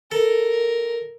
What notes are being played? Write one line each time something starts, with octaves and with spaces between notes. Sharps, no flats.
A4 A#4